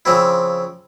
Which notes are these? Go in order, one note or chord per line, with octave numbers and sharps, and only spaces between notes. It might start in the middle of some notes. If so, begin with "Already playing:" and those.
C#3 F3 C4 E4